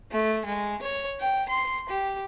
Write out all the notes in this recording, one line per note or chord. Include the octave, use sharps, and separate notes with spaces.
A3
G#3
C#5
G5
C6
G4